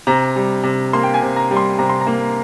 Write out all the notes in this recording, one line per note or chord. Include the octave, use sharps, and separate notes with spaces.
C3 A#5
G3
C3
A#3 C6
G5
G#5
C3
A#5
G3
C6
C3 A#5
C6
A#5
A#3